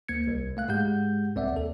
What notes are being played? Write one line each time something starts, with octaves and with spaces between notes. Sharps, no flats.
D2 A#3 G#6 C#7
C2
A3 F5 F#6
G#2 G#3 G4 F#5 G6
C2 C4 D5 E5 F#5
D#2 A4